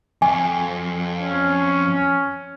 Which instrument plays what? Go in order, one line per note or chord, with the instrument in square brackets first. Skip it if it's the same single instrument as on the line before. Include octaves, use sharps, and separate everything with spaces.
[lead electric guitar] F2 [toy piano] G#5
[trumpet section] C#4